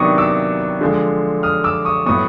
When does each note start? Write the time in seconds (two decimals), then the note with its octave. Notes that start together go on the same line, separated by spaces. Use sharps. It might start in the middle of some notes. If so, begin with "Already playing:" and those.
Already playing: C3 D#3 F#3 B3 D4 C#6 D#6
0.18 D6 E6
0.81 D3 F3 G#3
1.43 D#6 F6
1.64 D6 E6
1.85 C#6 D#6
2.06 A2 F#3 B3 C#6 D#6